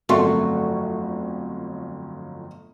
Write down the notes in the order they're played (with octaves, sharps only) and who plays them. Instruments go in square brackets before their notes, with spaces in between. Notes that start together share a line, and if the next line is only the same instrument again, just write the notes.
[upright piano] G1 F2 F#3 [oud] A3 [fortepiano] F#4 C6